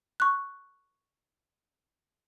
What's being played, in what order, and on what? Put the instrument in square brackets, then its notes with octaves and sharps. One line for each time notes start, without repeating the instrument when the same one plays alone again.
[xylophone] C#6 F#6